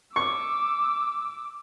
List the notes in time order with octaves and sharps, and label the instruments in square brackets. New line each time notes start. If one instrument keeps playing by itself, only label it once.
[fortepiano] C#6 [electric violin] D6 E6